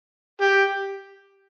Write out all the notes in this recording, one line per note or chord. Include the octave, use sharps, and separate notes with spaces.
G4